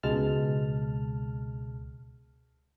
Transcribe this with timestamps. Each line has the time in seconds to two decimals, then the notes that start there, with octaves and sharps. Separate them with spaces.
0.03 C#2 B2 G#3 A5 F6